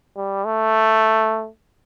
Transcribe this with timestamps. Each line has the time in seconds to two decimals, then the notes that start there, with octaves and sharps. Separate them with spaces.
0.16 G3
0.45 A3